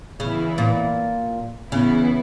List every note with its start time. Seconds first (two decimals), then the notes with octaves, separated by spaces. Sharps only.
0.20 C#3 E3 B3 E4
0.58 A#2
1.72 C#3 E3 B3 E4